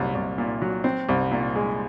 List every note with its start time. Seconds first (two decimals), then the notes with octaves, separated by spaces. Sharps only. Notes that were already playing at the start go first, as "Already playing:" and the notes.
Already playing: C2 A#2 F#3
0.15 C2
0.38 A#2
0.62 F#3
0.84 C4
1.09 C2
1.31 A#2
1.55 G#3